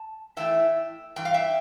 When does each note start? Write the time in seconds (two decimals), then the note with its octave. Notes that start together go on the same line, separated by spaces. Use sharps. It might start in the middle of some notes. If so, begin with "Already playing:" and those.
Already playing: A5
0.37 A2 E3 A3 E4 E5 G5
1.16 G2 E3 G5
1.25 F5
1.34 E5 G5